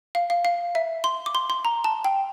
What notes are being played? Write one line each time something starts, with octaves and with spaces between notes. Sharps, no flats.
F5
F5
F5
E5
C6
D6
C6
C6
A#5
A5
G5